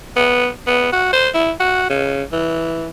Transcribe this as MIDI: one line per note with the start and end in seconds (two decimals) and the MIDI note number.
0.16 0.49 59
0.67 0.92 59
0.92 1.10 66
1.13 1.29 72
1.34 1.52 64
1.60 1.87 66
1.90 2.23 49
2.33 2.88 52